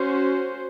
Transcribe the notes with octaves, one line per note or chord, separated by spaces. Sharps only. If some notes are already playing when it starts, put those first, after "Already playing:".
Already playing: C#4 F#4 C5